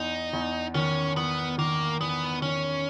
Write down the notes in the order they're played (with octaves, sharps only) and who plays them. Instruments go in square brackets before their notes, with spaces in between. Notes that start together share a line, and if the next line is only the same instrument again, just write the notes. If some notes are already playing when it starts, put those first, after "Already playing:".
Already playing: [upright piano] E2 [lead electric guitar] D#4
[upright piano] E2
[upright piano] D#3 [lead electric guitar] C#4
[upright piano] E2 [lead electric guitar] B3
[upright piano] D#3 [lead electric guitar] A#3
[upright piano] E2 [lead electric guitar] B3
[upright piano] D#3 [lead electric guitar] C#4